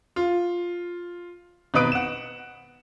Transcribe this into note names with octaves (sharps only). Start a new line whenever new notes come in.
F4
G#1 B2 D#4 B4 D#6 D7
F#5 E7